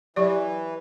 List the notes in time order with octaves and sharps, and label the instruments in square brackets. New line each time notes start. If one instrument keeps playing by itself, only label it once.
[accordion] E3 [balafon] F#3 G4 D5